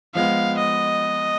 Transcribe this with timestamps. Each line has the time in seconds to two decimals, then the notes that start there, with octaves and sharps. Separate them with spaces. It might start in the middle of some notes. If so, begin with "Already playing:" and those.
0.15 F3 G#3 B3 F5
0.59 D#5